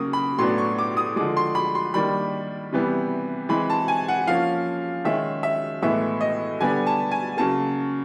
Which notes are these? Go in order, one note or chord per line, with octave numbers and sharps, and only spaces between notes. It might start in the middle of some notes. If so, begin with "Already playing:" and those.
Already playing: C#3 F#3 A#3 D#6
B5
A2 F#3 B3 D4 C6
C#6
D6
D#6
D3 F3 G#3 D6
C6
B5
C6
D#3 G3 A#3 D4 B5
C3 E3 G3 B3
E3 G#3 C4 B5
A5
G#5
F#5
F3 A#3 C#4 F5
D#3 G#3 C#4 E5
E5
A2 E3 G#3 B3 E5
D#5
D3 G3 B3 D4 G#5
A5
G#5
C#3 F#3 A#3 A5